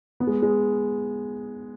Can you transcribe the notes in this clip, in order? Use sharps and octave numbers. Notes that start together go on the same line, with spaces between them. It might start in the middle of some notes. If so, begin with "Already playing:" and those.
B3
G#3
G#3